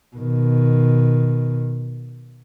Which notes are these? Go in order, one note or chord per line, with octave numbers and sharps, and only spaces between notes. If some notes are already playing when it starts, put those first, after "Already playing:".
B2 D#3